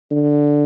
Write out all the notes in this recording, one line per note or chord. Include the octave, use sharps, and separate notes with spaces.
D3